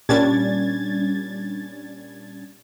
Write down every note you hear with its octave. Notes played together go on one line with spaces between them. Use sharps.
A#2 G3 C#4 D4 G#6 A6